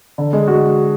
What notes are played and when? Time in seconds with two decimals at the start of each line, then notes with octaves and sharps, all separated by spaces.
0.18 D3
0.33 G#3
0.48 F#4